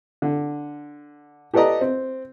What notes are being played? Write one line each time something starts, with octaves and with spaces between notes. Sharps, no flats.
D3
G4 A4 B4 D5 D#5 A#5
C4